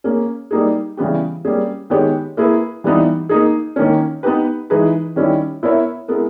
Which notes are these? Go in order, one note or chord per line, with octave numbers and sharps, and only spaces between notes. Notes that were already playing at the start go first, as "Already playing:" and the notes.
A#3 C#4 G#4
G3 A#3 D#4 G#4
C#3 E3 G3 B3 G4
G3 A#3 C#4 G#4
D#3 G#3 B3 G4 C#5
A#3 E4 G#4 B4
E3 G3 B3 D#4
A#3 D#4 G#4
D#3 A#3 C#4
B3 D#4 G4 B4
E3 G#3 D#4 G#4 B4
D#3 G3 C#4 E4
B3 E4 A#4 C#5 E5
G#3 B3 E4 A#4